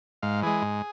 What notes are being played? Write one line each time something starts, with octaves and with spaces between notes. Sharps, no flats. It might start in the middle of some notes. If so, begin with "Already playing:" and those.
G#2 F5
E3 G#3 G#4
G#2